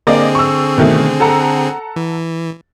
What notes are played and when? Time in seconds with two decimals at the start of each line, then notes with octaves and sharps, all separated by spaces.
0.07 D3 A#3 C4 G#4 D5 D#5
0.35 C#6 E6
0.78 B2 D#3 A3
1.20 A4 F#5 A#5
1.96 E3